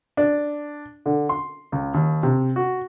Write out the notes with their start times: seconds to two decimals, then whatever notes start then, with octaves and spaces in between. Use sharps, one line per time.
0.17 D4
1.06 D3
1.29 C6
1.72 C#2
1.94 D#2
2.23 C3
2.56 F#4